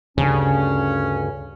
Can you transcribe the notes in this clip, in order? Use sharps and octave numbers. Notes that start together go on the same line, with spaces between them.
D2 G2 C#3 C#4